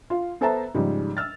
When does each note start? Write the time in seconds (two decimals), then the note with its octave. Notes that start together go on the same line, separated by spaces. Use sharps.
0.10 F4
0.41 B3 A4 C5 E5 A5 A#5
0.75 G#2 C#3 F3 G3
1.17 E6 F6 A6